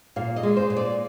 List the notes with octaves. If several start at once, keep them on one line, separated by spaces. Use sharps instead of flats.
A#2 F5
D#5
G#3
C5
A#2
D5